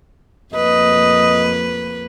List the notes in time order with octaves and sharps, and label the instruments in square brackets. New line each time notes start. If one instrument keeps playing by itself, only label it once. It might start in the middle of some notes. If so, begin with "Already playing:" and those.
[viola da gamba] F2 A#3 B4 [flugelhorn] D#5